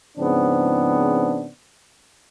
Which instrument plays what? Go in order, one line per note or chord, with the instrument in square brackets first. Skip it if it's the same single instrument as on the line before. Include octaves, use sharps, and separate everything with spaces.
[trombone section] G#2 C#3 F3 B3 C4 D4